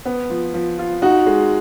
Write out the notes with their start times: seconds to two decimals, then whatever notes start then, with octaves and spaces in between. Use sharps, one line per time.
0.05 B3
0.30 F3
0.54 F3
0.79 F4
1.02 D#4 F#4
1.26 G#3